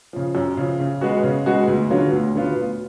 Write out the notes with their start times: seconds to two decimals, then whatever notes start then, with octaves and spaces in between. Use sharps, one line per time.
0.13 C#3 F3
0.35 F#2
0.57 C#3 F3
0.80 C#3
1.01 G#3 B3 F#4
1.23 C#3
1.46 G#3 B3 F#4
1.67 D2
1.90 D3 F#3 B3 F4
2.12 D2
2.34 D3 F#3 B3 F4
2.56 D2